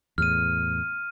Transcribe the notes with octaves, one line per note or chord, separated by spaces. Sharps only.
E2 A2 F6 D#7